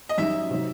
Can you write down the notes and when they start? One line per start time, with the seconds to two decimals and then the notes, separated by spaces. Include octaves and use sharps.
0.09 D#5
0.18 F#2 D#3 G3 D#4 E5
0.50 C3 D#3 F#3